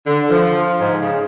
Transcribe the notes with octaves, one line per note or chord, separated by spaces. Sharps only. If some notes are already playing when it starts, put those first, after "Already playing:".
D3
F3
G#2
C#3